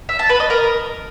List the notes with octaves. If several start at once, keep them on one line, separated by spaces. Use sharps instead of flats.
E5
A5
B4
D#5
A#4